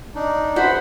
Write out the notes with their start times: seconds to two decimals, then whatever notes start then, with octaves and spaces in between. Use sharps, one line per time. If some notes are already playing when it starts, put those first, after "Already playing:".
0.15 D4 D#4
0.56 C#2 E4 F#4 C5 F#5 B5